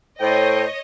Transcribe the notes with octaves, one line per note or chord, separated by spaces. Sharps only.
A2 A4 C5 C#5 D#5 G5